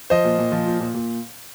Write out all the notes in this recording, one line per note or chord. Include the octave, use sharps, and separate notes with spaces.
F3 C5 D#5
A#2
A#2
F3
A#2
A#2
A#2